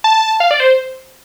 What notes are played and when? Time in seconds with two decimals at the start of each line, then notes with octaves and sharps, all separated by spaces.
0.04 A5
0.40 F5
0.51 D5
0.60 C5